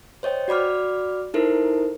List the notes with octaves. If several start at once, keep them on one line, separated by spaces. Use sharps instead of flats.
C5 C#5 D#5 G5
F#4 D5 B5 D6 F6
D#4 E4 A4 A#4 C5